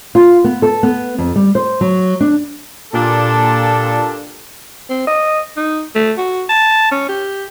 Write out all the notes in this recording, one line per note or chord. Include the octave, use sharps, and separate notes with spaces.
F4
B3
A4
B3
F2
G3
C5
F#3
D4
A#2 D4 G4 A4
C4
D#5
D#4
A3
F#4
A5
C#4
G4